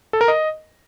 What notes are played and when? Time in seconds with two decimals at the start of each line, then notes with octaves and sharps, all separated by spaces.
0.13 A4
0.21 A#4
0.28 D#5